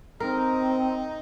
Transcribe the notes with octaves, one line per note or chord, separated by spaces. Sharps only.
C4 D#4 A#4